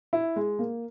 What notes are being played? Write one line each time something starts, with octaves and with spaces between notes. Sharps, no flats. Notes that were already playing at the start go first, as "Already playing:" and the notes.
E4
G#3
A#3